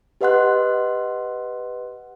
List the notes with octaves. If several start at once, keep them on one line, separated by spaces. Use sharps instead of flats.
G4 B4 D#5 F#5 C6 F#6